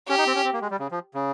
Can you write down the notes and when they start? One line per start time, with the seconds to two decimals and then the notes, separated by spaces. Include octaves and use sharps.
0.09 C#4 G4
0.18 D#4
0.27 C4
0.35 C#4
0.44 C4
0.53 A#3
0.62 G#3
0.70 G3
0.79 C#3
0.91 F3
1.14 C#3